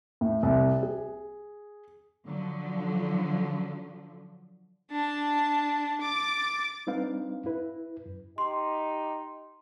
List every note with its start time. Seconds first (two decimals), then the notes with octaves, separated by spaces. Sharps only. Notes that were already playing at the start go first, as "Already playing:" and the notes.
0.21 A2
0.43 C2
0.83 G#4
2.26 D3 F3 F#3
4.91 D4 A5
6.02 D6 A6
6.87 G3 C4 D4 D#4 B4 F5
7.46 E4 B4
8.06 F#2
8.38 D#4 G4 C6